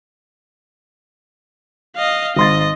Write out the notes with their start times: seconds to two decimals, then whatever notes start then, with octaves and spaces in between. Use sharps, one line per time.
1.96 D#5 F5
2.36 G#1 D#5 C6 A6